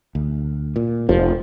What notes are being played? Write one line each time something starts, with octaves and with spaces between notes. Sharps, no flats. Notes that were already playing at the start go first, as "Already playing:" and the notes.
D2
A#2
F1 F3